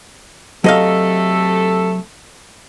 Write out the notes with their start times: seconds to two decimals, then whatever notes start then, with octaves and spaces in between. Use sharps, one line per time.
0.64 C3 F#3 A3 A4 D#5 F5